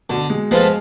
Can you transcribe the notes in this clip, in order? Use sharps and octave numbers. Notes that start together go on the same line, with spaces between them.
B2 D3
G#3
F3 G#3 B3 F4 A4